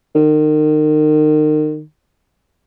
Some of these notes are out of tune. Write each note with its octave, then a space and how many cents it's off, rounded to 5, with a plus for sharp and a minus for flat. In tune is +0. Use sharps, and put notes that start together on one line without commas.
D#3 -35